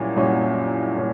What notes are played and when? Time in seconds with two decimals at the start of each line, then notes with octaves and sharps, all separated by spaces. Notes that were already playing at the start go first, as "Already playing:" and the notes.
Already playing: C2 A#2 F#3 C#4
0.16 C2 A#2 F#3 C#4
0.98 A#2 C#4